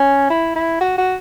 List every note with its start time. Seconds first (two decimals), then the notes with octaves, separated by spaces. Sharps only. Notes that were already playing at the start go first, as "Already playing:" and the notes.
Already playing: C#4
0.30 E4
0.55 E4
0.81 F#4
0.98 F#4